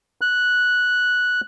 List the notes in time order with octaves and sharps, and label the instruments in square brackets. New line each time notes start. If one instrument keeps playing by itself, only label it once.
[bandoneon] F#6